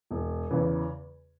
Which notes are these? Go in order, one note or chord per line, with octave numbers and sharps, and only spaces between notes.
E1
E2 C#3 E3